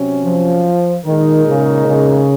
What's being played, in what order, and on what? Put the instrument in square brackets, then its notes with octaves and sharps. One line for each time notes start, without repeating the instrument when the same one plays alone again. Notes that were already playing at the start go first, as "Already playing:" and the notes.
Already playing: [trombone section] C3 F#3 C#4
[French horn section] F3
[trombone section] A#2 G#3 D#4 A#4 [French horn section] D#3
[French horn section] C#3
C#3